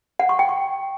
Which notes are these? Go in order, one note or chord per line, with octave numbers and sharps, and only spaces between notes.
F#5
C#6
G5
C#6